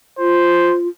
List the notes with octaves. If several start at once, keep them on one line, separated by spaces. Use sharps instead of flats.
F4 C5